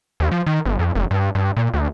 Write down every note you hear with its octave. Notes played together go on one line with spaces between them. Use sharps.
D#2
F3
D#3
G1
F2
F1
G2
G2
A#2
D2